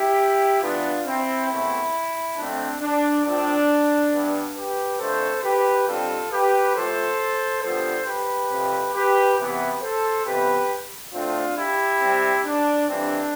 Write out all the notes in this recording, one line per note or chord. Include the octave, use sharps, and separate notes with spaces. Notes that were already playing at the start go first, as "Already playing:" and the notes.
Already playing: E4 G4
G2 E3 B3 D4 F4
C4 E4
E2 B2 A3 C4
F2 D3 A3 C4 D4
D4
A2 F3 C4 D4
G2 E3 B3
G4 B4
F2 D3 A3 A4 C5
G4 B4
F2 D3 G3 C4 F4 A4
G4 B4
A2 F3 A3 A4 C5
G2 D3 F3 B3 A4 C5
G4 B4
F2 C3 F3 C4
G4 B4
E2 C3 E3 B3 G4 B4
A4 C5
F2 C3 E3 B3 G4 B4
A2 F3 A3 C4 D4 F4
E4 G4
C3 G3 C4
D4
F2 E3 G3 C4 D4